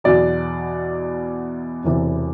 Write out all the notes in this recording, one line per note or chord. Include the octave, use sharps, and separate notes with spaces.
E2 B2 F#3 D5
E1 E2 C3 E3